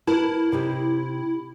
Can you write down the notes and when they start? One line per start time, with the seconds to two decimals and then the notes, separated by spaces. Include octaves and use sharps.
0.07 E4 A#4 B4 A5
0.52 C3 D#4 G4